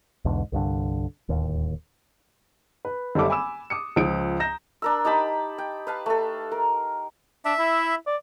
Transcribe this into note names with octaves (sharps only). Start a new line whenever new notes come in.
B1 E2 G#2 D3
C2 G2 D3
D1 D#2
B4
F#1 G3 C#4 A4 E5 D6
G#5 B5 D6 E6 E7
D6 D#6 C#7
C#2 F3 D#6 D7
A#5 G6 A#6 E7
D4 A#4 E6
D#4 G4 A5 B5
G5
B4 F5 A5
A3 A4
A#4
D4 E5
E4
D5